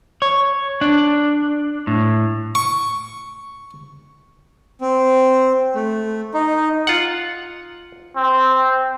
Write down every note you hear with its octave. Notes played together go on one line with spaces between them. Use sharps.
C#5
D4
A2
C#6
C4
A3
D#4
F4 F#5
C4